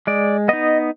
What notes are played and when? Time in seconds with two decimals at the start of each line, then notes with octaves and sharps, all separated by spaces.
0.07 G#3 D5
0.48 B3 D#4 D#5